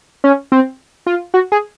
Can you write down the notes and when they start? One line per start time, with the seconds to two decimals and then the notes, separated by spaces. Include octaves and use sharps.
0.24 C#4
0.52 C4
1.07 F4
1.34 F#4
1.52 G#4